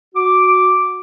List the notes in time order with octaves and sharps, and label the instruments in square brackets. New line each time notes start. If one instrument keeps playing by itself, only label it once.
[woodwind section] F#4 D6